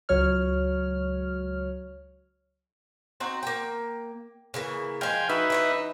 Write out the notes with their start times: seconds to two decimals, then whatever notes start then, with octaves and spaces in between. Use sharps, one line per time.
0.09 C#2 F#3 C#5 F6
3.20 C4 D#4 F#4
3.43 A#3 G5
4.54 C#3 E3 A#3
5.01 F3 G#3 F5 G5 G#5
5.29 D#4 F#4 B4 E5
5.50 E3 C#5 D#5